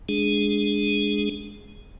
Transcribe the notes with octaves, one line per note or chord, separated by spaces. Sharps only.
G#3 D4 G#4